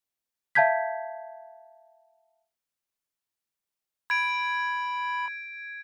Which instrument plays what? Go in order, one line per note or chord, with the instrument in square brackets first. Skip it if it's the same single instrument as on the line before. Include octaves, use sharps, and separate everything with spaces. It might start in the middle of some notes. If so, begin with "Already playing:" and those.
[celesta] E5 F5 A5 G6 G#6 B6
[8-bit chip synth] B5 [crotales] G#6 D7